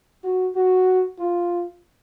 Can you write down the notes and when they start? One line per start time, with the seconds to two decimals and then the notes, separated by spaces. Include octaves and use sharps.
0.24 F#4
0.56 F#4
1.19 F4